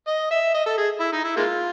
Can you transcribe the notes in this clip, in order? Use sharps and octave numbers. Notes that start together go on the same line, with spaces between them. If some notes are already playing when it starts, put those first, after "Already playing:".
D#5
E5
D#5
A4
G#4
E4
D#4
E4
G#3 A#3 F4